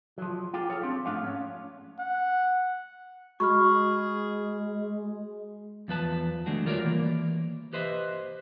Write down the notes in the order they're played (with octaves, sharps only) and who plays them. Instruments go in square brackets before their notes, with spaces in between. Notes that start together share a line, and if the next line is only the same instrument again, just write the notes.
[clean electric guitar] F3 F#3
F4 G4 G#4
G#4 A4 C#5 F5
C4 D4 G4
G#2 F3 A3 D4 F5
C#4
[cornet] F#5
[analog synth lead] G#3 [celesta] F#4 B5 F6 [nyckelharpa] G#4 [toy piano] C#6
[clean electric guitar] E2 F3 B4 A5
D#3 G#3 A3 D4 F#4
G3 F4 A#4 C#5 D5
E3 A#3
G4 B4 C5 D#5 E5